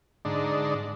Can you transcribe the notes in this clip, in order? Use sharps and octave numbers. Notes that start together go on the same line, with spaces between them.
G#2 D3 D4 D#4